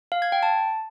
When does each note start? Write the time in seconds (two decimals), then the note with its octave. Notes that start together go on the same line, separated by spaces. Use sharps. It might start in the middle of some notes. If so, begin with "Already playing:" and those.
0.12 F5
0.22 G#6
0.32 G5
0.43 A5